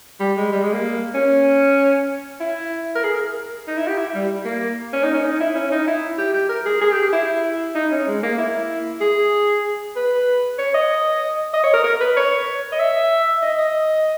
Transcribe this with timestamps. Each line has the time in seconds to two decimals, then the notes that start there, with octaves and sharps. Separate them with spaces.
0.20 G3
0.37 G#3
0.53 G3
0.63 G#3
0.73 A#3
1.14 C#4
2.40 E4
2.95 A#4
3.04 G#4
3.14 A#4
3.67 D#4
3.78 E4
3.87 G4
3.98 E4
4.14 G3
4.45 A#3
4.93 C#4
5.03 D#4
5.14 C#4
5.24 D#4
5.40 E4
5.55 C#4
5.72 D#4
5.88 E4
6.18 G4
6.34 G4
6.49 A#4
6.66 G#4
6.81 G#4
6.91 G4
7.02 G4
7.12 E4
7.75 D#4
7.92 C#4
8.07 G#3
8.23 A#3
8.38 E4
9.01 G#4
9.96 B4
10.58 C#5
10.74 D#5
11.54 D#5
11.64 C#5
11.74 A#4
11.84 A#4
12.00 B4
12.17 C#5
12.72 D#5
12.79 E5
13.42 D#5
13.58 D#5